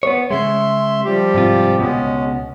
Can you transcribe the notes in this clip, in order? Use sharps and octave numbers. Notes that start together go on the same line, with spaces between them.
B3 C#5
C#3 G#3 E5 C6
F3 G3 G4
G#2 C3 F4
C#2 B2 G#3 C#4